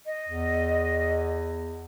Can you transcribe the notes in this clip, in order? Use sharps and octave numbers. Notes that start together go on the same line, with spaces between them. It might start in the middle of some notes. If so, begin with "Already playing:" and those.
D#5
E2